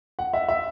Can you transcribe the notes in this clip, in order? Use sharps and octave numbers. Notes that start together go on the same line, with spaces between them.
F#5
E5
E5